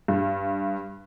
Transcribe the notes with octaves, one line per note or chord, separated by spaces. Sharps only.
G2